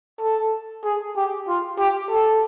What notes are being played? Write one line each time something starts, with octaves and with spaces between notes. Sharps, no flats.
A4
G#4
G4
F4
G4
A4